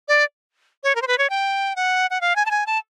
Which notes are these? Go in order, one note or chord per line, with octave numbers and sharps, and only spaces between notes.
D5
C#5
A#4
C5
B4
C#5
G5
F#5
F#5
F5
G#5
A5
G#5
A5